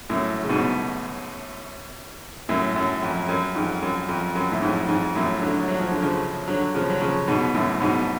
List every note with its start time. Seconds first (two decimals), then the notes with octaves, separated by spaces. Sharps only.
0.09 F#2 A2
0.43 C#3
0.49 G#2 B2
2.49 F#2 A2
2.76 F#2
3.02 F2
3.29 F#2
3.55 F2 G#2
3.82 F#2
4.09 F2
4.35 F#2
4.52 A2
4.62 F2 G#2
4.88 F2 G#2
5.15 F#2 A2
5.42 D3 F#3
5.68 F#3
5.79 F3
5.91 D3
6.02 C#3 F3
6.48 D3 F#3
6.74 C#3 F3
6.90 F#3
7.01 C#3 F3
7.28 G#2 B2
7.55 F#2 A2
7.81 G#2 B2